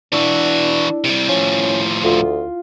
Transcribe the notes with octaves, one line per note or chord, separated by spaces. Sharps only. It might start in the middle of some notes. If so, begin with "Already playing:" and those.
E3 D4 E4 F#4
C3 G3
A2 F3 C#4
D2 F4